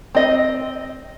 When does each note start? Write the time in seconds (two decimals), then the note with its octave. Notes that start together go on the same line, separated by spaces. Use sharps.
0.15 C4 D#5